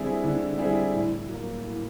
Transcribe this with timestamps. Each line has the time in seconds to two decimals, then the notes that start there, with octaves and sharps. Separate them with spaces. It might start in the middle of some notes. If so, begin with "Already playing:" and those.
Already playing: D3 G3 C4 E4 G#4
0.23 D3
0.58 G3 C4 E4 G#4
0.93 A2
1.28 F#3 A#3
1.62 A2